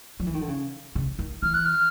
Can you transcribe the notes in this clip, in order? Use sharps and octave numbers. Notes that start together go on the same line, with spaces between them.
F3
E3
D#3
D3
C#3
C#3
D#3
E3 F6
F#6
F6